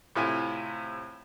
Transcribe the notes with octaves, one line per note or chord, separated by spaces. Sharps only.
A2 C3 E4 F4 G#5